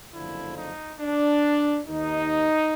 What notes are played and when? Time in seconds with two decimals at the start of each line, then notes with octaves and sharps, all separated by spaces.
0.13 F#1 F2 D3 F3 E4
0.57 D#4
1.01 D4
1.87 D#2 D#3 D#4